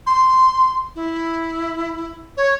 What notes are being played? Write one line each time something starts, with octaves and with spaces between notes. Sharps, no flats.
C6
E4
C#5